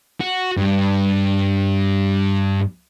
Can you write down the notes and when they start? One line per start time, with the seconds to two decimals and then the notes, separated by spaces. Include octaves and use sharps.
0.21 F#4
0.57 G2